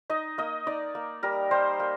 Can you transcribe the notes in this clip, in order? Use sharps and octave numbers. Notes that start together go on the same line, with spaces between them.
D#4 D#5
A#3 D#5
D#4 D5
A#3
G3 A#4
G3 C5
A#3